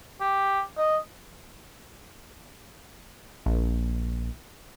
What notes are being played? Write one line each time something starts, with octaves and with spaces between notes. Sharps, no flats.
G4
D#5
A#1